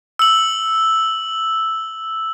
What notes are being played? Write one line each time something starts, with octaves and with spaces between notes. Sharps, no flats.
E6 F#7